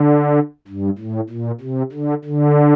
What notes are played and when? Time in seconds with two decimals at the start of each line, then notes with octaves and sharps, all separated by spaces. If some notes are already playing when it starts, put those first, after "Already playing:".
Already playing: D3
0.68 G2
0.99 A2
1.29 A#2
1.61 C3
1.92 D3
2.25 D3